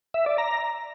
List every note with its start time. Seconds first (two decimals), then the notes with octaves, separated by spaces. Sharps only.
0.14 E5
0.26 D5
0.38 A#5